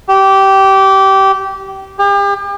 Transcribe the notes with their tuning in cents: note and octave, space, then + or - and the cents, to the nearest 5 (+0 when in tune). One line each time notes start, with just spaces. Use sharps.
G4 -20
G4 +40